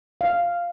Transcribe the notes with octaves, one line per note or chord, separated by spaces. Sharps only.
F5